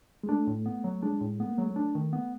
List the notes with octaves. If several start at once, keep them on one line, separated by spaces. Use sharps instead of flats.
G#3
A3 D4
A2
B3
F#3
G#3 D4
A2
A3 B3
A#3
F#3 G#3
A3
D4
D#3
B3